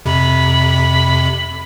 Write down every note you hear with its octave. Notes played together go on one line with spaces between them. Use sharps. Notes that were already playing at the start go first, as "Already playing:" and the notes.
F2 C3 B5